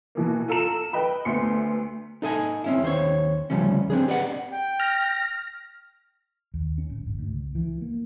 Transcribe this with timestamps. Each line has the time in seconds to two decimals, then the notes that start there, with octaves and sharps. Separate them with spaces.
0.15 B2 E3 A#3
0.48 F4 A4 A#5 E7
0.93 B4 D#5 G5 B5
1.25 D2 A3 B3 C6 C#7
2.22 D#4 A4 D#5 G#5
2.64 C4 C#4 E4
2.82 D#2 C5 C#5
3.50 D2 A#2 C#3 F3 G3 C#4
3.90 C4 D4 G#4
4.08 G4 B4 D5 D#5 F#5
4.51 G5
4.80 F6 A#6
6.54 D#2
6.78 C#4
6.90 D1
7.06 G1
7.18 D2
7.31 C#2
7.55 E3
7.81 A#3